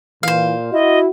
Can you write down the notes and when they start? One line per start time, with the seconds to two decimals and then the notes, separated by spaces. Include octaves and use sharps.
0.23 A#2 E3 C5 F5
0.73 E4 F#4 D#5